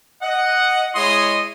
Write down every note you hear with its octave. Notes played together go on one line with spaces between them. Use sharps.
D#5 F#5
G#3 E4 C#5 D#5 C6 D#6